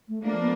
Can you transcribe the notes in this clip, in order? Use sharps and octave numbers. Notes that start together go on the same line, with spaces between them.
A3
F3 A3 A#3 D4
B3